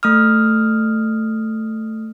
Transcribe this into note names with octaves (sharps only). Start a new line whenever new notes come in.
A3 D#6 F6